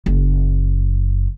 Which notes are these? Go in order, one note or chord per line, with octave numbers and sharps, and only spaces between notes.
F#1